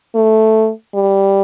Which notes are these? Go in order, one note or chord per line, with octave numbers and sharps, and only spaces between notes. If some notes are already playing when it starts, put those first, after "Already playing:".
A3
G3